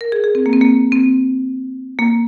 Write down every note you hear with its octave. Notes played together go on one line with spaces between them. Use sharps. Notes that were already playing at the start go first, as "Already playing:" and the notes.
A#4
G#4
G#4
C4
A#3
C4
A#3
C4
A#3